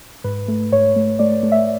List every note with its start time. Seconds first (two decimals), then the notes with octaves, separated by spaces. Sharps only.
0.24 G#2 B4
0.48 A3
0.72 G#2 C#5
0.96 A3
1.19 A3 D5
1.43 A3
1.52 E5